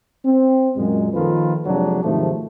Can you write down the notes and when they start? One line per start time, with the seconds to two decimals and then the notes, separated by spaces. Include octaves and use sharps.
0.25 C4
0.77 F#2 A#2 G#3
1.14 D#3 F3 A#3 F4 A4 B4
1.66 F2 C3 F3 F#3 G#3 D4
2.04 G#2 C3 D#3 F3 F#3 A3